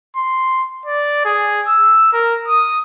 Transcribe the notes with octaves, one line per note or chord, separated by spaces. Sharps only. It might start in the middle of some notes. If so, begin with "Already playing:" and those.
C6
D5
G#4
E6
A#4
D#6